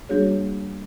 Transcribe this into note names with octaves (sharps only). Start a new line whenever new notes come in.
G3 A#3 D4 F#4 G#4 C#5